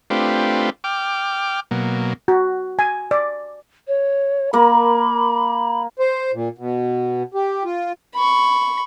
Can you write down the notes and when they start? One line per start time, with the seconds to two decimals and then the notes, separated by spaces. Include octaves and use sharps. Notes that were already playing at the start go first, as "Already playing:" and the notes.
0.10 A3 C4 D4 F4 G4 B4
0.84 G5 D6 F6
1.71 B2 F#3 A#3
2.28 F#4
2.79 G#5
3.11 D5
3.87 C#5
4.53 A#3 A#4 B5
5.99 C5
6.34 A#2
6.58 B2
7.34 G4
7.65 F4
8.15 B5 C#6